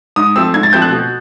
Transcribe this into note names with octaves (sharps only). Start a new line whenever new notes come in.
G#2 D#6
F3 A3 C4 E6
G#2 G#6
A6
F3 A3 C4 G6
F#6
B2